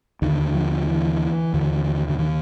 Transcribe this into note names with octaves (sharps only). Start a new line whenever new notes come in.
D#2 D3 D#3
F3
E3
D#2 D3
D3
D#3